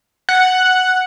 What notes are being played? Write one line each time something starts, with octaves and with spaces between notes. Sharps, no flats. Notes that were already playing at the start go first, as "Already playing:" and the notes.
F#5